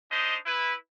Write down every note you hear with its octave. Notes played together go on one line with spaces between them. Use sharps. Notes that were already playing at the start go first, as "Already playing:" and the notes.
D4 D#4 C5 D#5
E4 B4